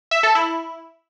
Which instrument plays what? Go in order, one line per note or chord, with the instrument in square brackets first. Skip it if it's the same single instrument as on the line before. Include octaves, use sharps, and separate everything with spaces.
[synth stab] E5
A4
E4